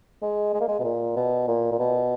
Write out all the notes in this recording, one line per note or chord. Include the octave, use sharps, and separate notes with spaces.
G#3
G#3
A#3
G#3
B2
A#2
B2
A#2
A#2
B2